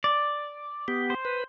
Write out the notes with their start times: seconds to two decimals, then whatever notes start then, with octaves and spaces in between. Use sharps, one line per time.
0.04 D5
0.88 B3 G4
1.10 C5
1.25 B4